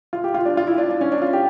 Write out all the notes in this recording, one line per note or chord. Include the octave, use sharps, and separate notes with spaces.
F4
G4
F4
D4
F4
E4
D4
D4
C#4
D4
F4
G4